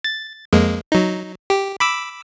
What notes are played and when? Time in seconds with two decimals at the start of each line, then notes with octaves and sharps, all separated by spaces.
0.04 A6
0.53 F2 G#3 A#3
0.92 F#3 D#4
1.50 G4
1.80 B5 D6 E6